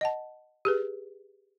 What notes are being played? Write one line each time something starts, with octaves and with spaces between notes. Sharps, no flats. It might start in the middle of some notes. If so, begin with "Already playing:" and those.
D#5 F#5 A5
G4 G#4 B4